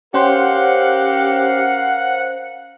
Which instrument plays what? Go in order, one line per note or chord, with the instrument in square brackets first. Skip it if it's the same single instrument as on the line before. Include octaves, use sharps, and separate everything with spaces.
[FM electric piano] C#4 C5 [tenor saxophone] G4 [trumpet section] A#4 F5 [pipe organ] F#5